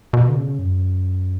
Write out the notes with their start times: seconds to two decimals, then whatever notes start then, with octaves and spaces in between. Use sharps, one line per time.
0.13 B2
0.29 D3
0.36 C#3
0.59 F#2